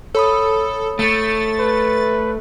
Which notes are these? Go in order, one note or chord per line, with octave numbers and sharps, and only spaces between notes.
A4 C#5 B5 D#6
A3 A6
B4